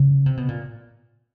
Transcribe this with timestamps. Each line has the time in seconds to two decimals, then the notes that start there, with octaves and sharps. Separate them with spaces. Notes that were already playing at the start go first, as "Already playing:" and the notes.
Already playing: C#3
0.26 C3
0.37 B2
0.48 A#2